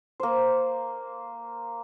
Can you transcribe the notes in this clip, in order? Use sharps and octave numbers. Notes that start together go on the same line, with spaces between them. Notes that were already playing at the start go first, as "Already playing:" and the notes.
A#3 C5